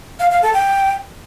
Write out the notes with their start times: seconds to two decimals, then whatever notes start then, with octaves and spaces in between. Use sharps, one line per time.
0.20 F5
0.31 F5
0.42 A4
0.54 G5